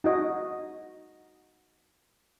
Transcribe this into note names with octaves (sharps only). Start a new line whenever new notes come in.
D#4 F#4 D#5